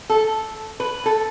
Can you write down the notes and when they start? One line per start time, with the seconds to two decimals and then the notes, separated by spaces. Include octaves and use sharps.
0.10 A4
0.80 B4
1.06 A4